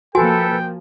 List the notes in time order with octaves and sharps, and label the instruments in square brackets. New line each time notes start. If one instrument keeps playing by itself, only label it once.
[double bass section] F3 A#3 [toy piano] F#4 G#5 [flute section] A4 B4 [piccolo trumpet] G5